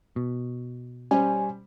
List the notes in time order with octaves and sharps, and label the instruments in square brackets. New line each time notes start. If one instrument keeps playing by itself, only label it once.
[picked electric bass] B2
[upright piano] G3 C5 [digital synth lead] C#4 [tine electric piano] G#5